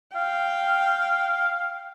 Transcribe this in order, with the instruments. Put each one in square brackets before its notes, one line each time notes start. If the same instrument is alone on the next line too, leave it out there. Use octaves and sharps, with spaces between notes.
[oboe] F5 [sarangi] G5